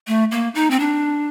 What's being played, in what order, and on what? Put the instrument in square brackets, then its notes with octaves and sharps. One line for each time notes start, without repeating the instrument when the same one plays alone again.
[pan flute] A3
A#3
D#4
C4
D4